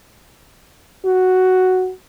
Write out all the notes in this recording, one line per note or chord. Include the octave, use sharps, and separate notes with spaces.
F#4